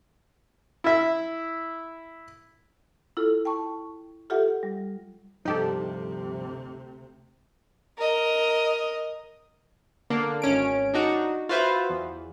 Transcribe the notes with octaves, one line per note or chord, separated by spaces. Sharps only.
E4 E5
E4 F4 A4
G5 A5 C#6
F4 G4 A4 E5 F#5
G3
D2 G2 C3 F3 D#4 G4 A4
A#4 D#5
D3 A#3 D4
G#1 C#4 D7
D4 D#4 F#4
F4 F#4 B4 C5 E5 F5
E2